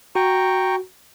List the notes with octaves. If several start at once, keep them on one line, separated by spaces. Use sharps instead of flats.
F#4 G5 A#5 C#6